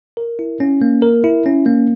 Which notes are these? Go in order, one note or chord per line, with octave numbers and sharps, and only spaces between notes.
A#4
E4
C#4
A#3
A#4
E4
C#4
A#3